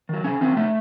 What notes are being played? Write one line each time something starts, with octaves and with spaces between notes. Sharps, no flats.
D#3 F#3
C3 C#4
D#3 F#3 C4
C3 A3